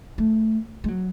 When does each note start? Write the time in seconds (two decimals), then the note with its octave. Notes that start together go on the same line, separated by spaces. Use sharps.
0.18 A3
0.84 G#3
0.88 F#3